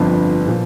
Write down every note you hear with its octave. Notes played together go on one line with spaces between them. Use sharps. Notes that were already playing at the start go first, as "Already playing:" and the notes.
Already playing: G1 F2 F3 D4
A#2 F3